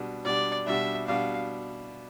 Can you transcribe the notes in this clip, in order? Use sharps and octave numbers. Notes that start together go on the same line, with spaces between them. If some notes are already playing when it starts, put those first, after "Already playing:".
Already playing: B2 G3 D4
B2 G3 D4 D5
B2 G3 D4 E5
B2 G3 D4 F5